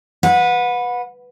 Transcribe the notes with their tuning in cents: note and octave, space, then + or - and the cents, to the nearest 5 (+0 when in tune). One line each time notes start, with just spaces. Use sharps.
B4 +0 F#5 -30